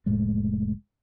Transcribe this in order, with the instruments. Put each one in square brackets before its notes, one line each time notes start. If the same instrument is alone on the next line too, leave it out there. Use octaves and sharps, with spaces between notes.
[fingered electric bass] F1 A2 G#3 A3